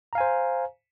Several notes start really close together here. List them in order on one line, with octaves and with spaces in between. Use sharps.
A#5 F5 G#5 C5